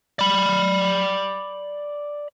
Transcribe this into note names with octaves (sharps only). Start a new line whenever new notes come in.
D5 B5